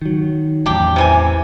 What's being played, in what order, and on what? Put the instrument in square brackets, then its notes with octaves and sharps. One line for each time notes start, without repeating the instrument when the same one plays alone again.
[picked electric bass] D#3 F#3
[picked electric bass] A1 E2 [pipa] D4 G4
[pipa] C3 E3 G#5